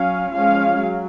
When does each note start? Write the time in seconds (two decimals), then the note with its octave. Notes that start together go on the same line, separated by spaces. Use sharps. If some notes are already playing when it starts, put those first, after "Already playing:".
Already playing: F#3 C#4 F5
0.33 F3 G#3 C#4 F5
0.78 F#3